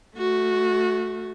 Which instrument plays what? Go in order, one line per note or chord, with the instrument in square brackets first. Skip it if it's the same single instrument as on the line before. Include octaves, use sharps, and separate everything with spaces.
[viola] A3 F#4